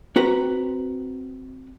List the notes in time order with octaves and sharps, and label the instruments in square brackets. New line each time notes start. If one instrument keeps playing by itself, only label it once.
[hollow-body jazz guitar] C4 F#4 B4 A#5